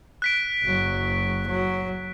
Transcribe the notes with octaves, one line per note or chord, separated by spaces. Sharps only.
F#6 B6 D7
F#1 F#3
F#3